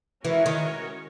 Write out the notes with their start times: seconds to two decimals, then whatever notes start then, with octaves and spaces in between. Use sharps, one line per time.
0.25 E3 G#3 C#4 F#4 A#4 C#5
0.46 D#3